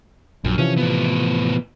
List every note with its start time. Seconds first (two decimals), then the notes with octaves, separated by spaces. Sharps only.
0.44 A#1 F#2
0.58 C3 E3 F3 C#4
0.77 A2 B3